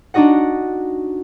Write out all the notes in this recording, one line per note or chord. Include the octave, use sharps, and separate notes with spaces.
D4 D#4 F#4 D#5 F#5